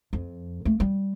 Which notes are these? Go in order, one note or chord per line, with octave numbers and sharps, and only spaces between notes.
F2
A3 A#3
G3